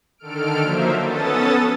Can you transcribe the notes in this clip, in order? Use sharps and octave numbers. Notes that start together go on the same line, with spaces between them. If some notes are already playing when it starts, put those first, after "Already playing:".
D3 D#3 A4 F6 D7
F3 F#3 A#3 D#4 C5 E5
B3 C#4 A4 D#6 A6